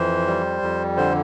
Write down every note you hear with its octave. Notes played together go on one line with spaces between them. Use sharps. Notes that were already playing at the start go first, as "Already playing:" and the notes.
Already playing: F2 E3 C5
G3
F2
D3 C5